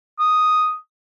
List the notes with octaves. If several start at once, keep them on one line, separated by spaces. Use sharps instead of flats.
D#6